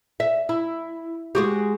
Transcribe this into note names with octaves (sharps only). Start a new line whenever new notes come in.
E5
E4
G#3 F#4 G4